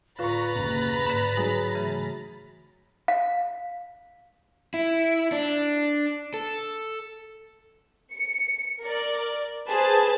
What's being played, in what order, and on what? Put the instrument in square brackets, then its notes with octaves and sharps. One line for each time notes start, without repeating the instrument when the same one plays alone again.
[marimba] A2 D3 [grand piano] F4 C#6 [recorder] B4 [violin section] A#5 B5 A6
[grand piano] F#1 D#2
[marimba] G#2 D3 [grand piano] E7
[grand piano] F#3 G#4 [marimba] D#4
[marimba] C#3 E3 A3
[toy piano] F5
[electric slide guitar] E4
D4
A4
[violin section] C#7
A#4 D5
G#4 B4 C5 A5